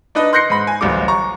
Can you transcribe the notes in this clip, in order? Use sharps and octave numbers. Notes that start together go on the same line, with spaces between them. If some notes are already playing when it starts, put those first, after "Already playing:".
D4 D#4 B4 D#5
C6 F#6 G6 A#6 C7 C#7
G#2 B5
G#5
D1 A1 G3 D6
A#5 C#6